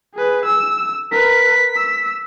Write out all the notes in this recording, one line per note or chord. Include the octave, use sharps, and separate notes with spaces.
G#4 B4
E6
A#4 B4 B6
E6